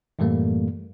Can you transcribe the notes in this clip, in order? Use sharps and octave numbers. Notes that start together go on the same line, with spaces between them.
F#2 A2 E3 G3 A3 A#3